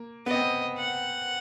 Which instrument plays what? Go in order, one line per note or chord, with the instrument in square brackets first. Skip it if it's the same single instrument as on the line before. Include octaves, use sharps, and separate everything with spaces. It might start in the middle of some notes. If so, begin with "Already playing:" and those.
Already playing: [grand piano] A#3
[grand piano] B3 [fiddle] D#5
[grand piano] C4
B3
[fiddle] F#5